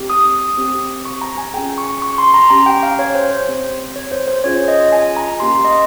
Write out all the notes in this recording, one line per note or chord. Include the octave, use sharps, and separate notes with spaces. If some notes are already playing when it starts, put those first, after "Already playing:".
Already playing: C4 G4
D#6
C4 G4
C#6
A#5
G#5
C#4 F4 G#4 G5
C#6
C#6
C6
A#5
C#4 G4 A#5
G5
F5
C#5
C5
C5
C4 G4
C#5
C5
C5
C#4 F4 G#4 C#5
D#5
G#5
A#5
A#3 C#4 G4 C6
D#5